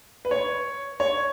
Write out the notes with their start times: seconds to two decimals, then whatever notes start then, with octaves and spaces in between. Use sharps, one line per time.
0.25 B4
0.31 C#5
1.00 C#5